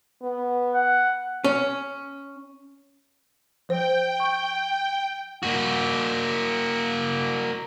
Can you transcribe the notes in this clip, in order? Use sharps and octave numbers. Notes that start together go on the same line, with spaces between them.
B3
F#5
C#4
F3 C5 G5
C#6
A#3 F#4